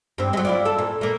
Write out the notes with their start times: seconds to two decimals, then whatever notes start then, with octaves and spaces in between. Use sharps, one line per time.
0.18 G2 C4
0.33 F#3 G#3
0.45 E4 F4 D5
0.65 A4
0.78 A#2
1.01 A3 A#3